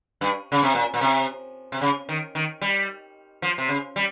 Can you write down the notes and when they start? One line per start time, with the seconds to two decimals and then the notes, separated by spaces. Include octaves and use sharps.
0.21 G2
0.52 C#3
0.63 C3
0.75 A#2
0.94 A#2
1.01 C3
1.72 C3
1.81 C#3
2.09 D#3
2.35 D#3
2.62 G3
3.42 F3
3.58 C3
3.69 C#3
3.96 G3